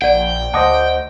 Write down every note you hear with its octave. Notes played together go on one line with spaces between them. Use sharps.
A#1 D5 F#5 G5
D2 C5 D#5 F#5 A5 D6 D#6